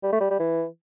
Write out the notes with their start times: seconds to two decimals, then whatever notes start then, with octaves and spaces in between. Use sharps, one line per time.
0.03 G3
0.12 A3
0.20 G3
0.30 G3
0.40 E3